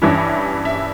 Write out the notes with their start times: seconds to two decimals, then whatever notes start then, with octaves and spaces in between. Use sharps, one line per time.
0.02 G2 E3 G3 C#4 E4 E5
0.65 E5